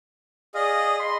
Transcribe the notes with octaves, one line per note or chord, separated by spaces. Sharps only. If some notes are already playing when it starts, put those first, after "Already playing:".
G#4 D5 D#5 F5 D#6
D#5 B5 C6